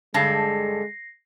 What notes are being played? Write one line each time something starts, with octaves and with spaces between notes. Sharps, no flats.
G2 D3 G#3 A5 A#6 C7